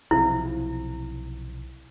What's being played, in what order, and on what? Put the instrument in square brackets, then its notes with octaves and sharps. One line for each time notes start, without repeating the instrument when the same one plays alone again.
[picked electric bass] B1 C3 F3 [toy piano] E4